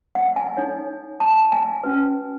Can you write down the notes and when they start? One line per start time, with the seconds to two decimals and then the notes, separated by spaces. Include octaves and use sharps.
0.15 F#5
0.36 G#5
0.57 D#4 A4 C#5
1.20 A5
1.52 G#5
1.84 C#4 F#4 B4